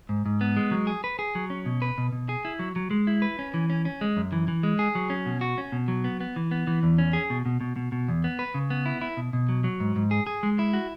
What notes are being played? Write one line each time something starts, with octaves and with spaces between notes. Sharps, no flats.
G#2
G#2
B3
G#3
F#3
G#4
B4
G#4
F#3
C#4
B2
B4
B2
B2
G#4
E4
F#3
F#3
G#3
E4
B4
C#4
E3
C#4
C#4
G#3
F#2
E3
E3
G#3
G#4
F#3
C#4
B2
F#4
C#4
B2
F#3
B3
B3
E3
B3
E3
E2
C#4
G#4
B2
B2
B2
B2
B2
E2
B3
B4
C#3
B3
E4
E4
B2
B2
F#3
F#3
G#2
G#2
G#4
G#4
G#3
E4
F#4